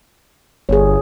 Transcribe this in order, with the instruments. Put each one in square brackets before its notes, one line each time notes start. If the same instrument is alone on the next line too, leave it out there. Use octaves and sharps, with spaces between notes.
[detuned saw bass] G1 [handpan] G#4 C#5